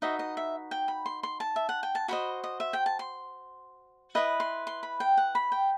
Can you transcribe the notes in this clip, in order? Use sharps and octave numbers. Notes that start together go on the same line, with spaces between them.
D#4 F#4 B4 D#5 E5
D#5
E5
G5
B5
C6
C6
A5
E5
F#5
G5
A5
F#4 C5 D#5 B5
D#5
E5
G5
A5
C6
E4 B4 D#5 D#6
C6
C6
B5
G5
F#5
B5
G5